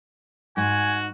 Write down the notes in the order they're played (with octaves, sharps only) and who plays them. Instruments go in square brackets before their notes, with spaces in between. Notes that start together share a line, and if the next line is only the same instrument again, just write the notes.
[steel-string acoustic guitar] G#2 [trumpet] F#4 [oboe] G#5